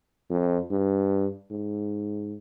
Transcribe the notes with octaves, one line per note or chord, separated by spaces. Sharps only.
F2
G2
G#2